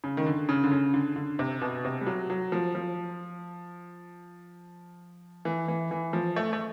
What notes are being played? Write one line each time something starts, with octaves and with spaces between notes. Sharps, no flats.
C#3
D#3
D3
C#3
D3
C#3
D3
D3
C3
B2
C3
G3
F#3
F#3
F3
F3
E3
E3
E3
F3
A3
A3